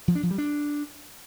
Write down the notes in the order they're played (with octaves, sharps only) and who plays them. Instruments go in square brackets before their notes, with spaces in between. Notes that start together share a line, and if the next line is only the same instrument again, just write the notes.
[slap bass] F3
D4
F3
G3
D4